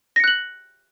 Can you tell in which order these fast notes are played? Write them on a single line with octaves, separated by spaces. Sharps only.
A#6 C#7 F#6 F#7